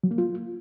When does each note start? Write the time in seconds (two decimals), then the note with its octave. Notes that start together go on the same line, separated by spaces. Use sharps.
0.04 F#3
0.11 A#3
0.18 F4